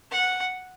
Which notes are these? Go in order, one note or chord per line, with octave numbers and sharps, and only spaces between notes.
F#5